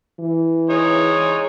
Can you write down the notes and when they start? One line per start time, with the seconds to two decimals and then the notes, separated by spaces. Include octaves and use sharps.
0.20 E3
0.70 G#3 D#4 C#5